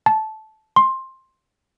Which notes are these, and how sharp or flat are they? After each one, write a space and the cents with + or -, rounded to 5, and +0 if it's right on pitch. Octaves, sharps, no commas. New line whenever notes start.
A5 -15
C6 +15